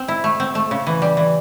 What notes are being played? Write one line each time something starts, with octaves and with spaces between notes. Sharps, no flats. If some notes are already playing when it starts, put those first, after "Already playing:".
Already playing: C4
E4
A3
C4
A3
C#3
E3
G3
E3